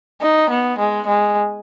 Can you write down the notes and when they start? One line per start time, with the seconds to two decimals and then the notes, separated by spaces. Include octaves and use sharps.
0.21 D#4
0.50 B3
0.78 G#3
1.07 G#3